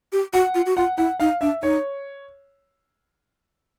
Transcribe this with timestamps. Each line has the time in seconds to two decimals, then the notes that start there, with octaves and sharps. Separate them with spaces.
0.12 G4
0.33 F#4 F#5
0.55 F4
0.66 F#4
0.77 F4 F#5
0.98 E4 F#5
1.20 D#4 F5
1.41 D4 E5
1.63 D#4 C#5